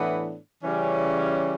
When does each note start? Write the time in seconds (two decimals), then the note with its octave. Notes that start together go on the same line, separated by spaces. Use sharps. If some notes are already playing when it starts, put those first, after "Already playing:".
Already playing: A2 E3 B3 D4
0.63 C#3 E3 G3 C#4